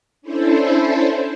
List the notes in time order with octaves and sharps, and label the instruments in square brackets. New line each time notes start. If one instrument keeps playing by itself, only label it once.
[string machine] C#4 D4 E4 A4 C5